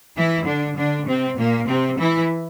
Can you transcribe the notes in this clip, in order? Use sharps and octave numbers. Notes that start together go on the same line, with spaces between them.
E3 E4
D3 D4
D3 D4
C3 C4
A#2 A#3
C3 C4
E3 E4